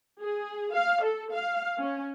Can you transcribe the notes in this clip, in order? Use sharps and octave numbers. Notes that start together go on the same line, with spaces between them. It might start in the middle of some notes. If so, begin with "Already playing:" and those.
G#4
F5
A4
F5
C#4